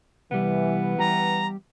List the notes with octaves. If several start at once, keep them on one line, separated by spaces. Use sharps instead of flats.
C2 E3 G3 B3
G3 G4 A#5